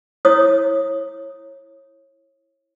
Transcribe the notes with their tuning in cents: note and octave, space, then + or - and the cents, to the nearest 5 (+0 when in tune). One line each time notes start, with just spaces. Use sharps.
E4 +0 C#5 -25 D#6 +0